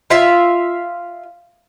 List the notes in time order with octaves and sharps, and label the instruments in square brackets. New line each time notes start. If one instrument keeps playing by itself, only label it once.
[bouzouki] F4 E5 F5